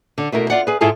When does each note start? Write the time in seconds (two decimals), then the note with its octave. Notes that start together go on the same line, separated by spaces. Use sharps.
0.18 D3
0.32 B2 A3 E4 A#4
0.50 F4 D5 F#5
0.67 G#4 B4
0.81 G#2 E4 F4 G#4 A4 A5